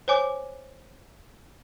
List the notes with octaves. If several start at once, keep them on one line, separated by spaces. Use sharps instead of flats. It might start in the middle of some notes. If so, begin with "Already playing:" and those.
C5 C#5 G#5 D6